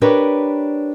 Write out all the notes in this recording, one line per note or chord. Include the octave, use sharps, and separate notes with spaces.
D4 G4 A#4 B4 C#5 D5